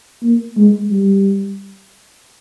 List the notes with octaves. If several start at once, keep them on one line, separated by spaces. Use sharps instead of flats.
A#3
G#3
G3